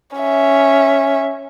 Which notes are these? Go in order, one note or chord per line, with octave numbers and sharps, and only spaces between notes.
C#4 E5